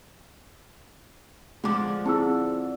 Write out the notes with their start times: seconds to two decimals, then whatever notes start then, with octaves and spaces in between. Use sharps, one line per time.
1.64 D3 F3 G#3 D6
2.06 C4 E4 G#4 A5 E6